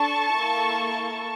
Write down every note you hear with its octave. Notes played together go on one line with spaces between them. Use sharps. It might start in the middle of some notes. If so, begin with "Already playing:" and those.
Already playing: D4 A4 A5 C#6
A#3 E4 A4